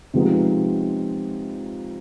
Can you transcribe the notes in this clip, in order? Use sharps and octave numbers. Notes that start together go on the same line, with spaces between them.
C3 F3 G#3 B3 D#4